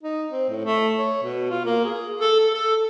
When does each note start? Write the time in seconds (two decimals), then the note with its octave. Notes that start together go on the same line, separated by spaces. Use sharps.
0.03 D#4
0.31 C4
0.49 A2
0.65 A3
0.98 C#5
1.23 B2
1.50 F4
1.65 A#3
1.85 G#4
2.21 A4
2.40 A4
2.54 A4